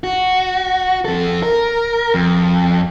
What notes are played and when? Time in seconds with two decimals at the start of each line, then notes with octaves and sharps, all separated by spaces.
0.04 F#4
1.05 F2 A4
1.43 A#4
2.14 F2